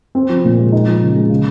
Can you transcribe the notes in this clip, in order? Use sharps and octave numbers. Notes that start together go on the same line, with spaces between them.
C4
F3
A#2
G#3
D#4
F3
C#3
G#3
C#3